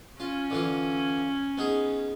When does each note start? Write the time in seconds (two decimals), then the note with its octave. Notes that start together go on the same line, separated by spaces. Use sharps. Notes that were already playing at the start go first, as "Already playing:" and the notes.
0.20 C#4 F4
0.50 D3 E3 F4
1.58 B3 D#4 G#4